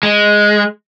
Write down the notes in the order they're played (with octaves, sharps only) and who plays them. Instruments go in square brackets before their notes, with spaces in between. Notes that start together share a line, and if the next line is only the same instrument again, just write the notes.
[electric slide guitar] G#3